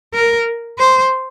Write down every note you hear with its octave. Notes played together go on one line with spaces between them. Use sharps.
A#4
C5